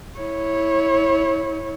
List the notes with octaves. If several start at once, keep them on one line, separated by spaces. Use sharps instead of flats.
E4 C#5